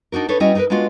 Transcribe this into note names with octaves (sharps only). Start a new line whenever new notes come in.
D4 D#4 F#4 A#4
D4 D#4 A4 B4 C#5
G3 C#4 E4 F#4 D#5
D#4 F#4 G#4 A#4 B4
G#3 A#3 B3 D4 F4 F#4